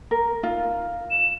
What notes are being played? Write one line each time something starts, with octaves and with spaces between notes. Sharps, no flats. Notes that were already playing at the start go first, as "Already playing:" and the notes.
A#4
D#4 F4
E7